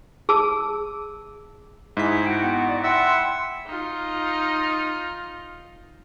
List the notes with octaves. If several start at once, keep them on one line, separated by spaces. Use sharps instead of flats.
G#4 A5 E6
G#2 E4 G#4 B6
F#4 G5
B3
D5
E4 E5 F#5 G5 C6
D#4 F4